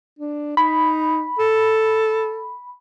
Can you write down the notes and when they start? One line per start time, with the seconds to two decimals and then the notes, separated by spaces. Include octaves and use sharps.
0.19 D4
0.57 D#4 B5
1.39 A4